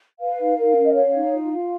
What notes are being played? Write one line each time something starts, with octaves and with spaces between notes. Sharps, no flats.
B4 F5
D#4
A#4
C#4
D#5
C#5 F5
D#4
F4
F4